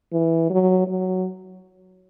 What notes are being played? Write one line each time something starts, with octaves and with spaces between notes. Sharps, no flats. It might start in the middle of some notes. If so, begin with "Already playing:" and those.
E3
F#3
F#3